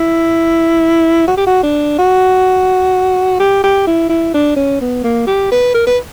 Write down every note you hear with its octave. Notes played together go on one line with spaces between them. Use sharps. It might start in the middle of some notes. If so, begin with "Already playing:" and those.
Already playing: E4
F#4
G4
F#4
D4
F#4
G4
G4
E4
E4
D4
C#4
B3
A#3
G4
B4
A#4
B4